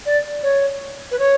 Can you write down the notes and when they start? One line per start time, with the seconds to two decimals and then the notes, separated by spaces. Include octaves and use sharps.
0.05 D5
0.43 C#5
1.11 B4
1.19 C#5